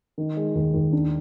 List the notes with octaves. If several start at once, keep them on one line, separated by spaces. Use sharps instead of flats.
D#3
G#3
D#2
D#2
D4